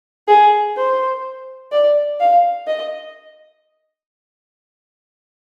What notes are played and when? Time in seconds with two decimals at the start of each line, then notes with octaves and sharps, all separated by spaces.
0.28 G#4
0.77 C5
1.72 D5
2.20 F5
2.67 D#5